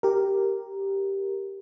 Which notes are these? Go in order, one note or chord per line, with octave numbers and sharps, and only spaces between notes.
G4 A#4